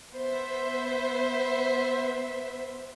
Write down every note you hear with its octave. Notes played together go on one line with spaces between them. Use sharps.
B3 C5 E5